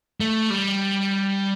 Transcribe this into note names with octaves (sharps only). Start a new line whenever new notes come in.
A3
G3